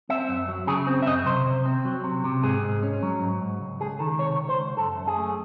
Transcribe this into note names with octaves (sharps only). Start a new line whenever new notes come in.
C4 E5
F#2
F#3
C#3 G#4
C4
E5
F#2 D#5
C3 C5
C3
C4
F#3
C3
C3
G#2 G#4
G#2
C#4
F#3
G#2
G#2
C#2
C#2 G#4
D#3 A4
C3 C#5
C#2
C5
C#2
F#2 A4
F#2
G#4
A3